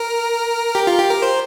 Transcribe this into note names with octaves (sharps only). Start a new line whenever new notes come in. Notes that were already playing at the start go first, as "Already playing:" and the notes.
Already playing: A#4
G4
F4
G4
A#4
C5